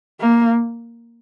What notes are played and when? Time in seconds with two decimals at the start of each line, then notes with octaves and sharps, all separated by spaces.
0.20 A#3